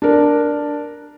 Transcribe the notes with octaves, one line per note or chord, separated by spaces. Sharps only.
D4 A#4